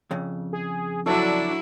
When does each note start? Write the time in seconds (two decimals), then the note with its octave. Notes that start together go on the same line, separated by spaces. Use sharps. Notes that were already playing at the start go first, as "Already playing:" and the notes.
0.11 F2 C#3
0.53 G#4
1.06 F#3 A3 D4 E4 C#5 E6